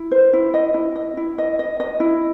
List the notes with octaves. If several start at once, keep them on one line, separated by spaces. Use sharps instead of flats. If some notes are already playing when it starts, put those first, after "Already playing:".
Already playing: E4
C5
E4
D#5
E4
D#5
E4
D#5
D#5
D#5
E4